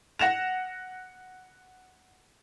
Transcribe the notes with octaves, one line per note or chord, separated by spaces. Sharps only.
F#5 A#6 E7 F7